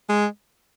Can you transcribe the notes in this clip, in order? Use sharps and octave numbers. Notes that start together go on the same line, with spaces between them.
G#3